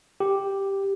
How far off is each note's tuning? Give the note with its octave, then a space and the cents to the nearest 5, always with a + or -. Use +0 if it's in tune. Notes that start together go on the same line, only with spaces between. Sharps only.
G4 +0